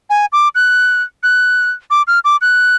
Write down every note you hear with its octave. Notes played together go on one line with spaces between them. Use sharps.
G#5
D6
F#6
F#6
D6
F6
D6
F#6